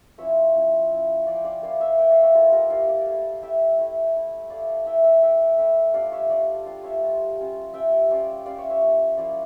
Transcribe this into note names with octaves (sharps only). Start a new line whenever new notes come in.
F3 C#4 E4 C#5 E5
F3 C#4 E4
F3 C#4 E4
F3 C#4 E4 D5 F5
G5
D5 F5
A#3 E4 D5 F5
C#5 E5
A#3 E4 E5 G5
D5 F5
C#5 E5
A#3 E4 F4 A4
G4 A#4
A#3 E4 D5 F5
D5 F5
A3 E4
A3 E4 E5 G5
A3 E4
A3 E4
A3 E4 D5 F5
A3 E4 E5 G5
E5 G5
A3 E4 E5 G5
A3 E4 E5 G5
G3 D4 F4 D5 F5
C#5 E5
G3 D4 F4 D5 F5
G3 D4 F4 D5 F5
C#5 E5
G3 D4 F4
G3 C#4 F4
G3 C#4 F4 E5 G5
G3 C#4 F4 D5 F5
G3 C#4 F4 D5 F5
C#5 E5
C#5 E5
F3 A#3 C#4 E4
F3 A#3 C#4 E4 D5 F5